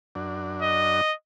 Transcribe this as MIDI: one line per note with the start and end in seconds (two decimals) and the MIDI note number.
0.15 1.01 42
0.15 1.01 62
0.62 1.14 75